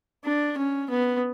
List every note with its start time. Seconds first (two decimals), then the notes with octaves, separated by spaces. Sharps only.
0.25 D4
0.57 C#4
0.90 B3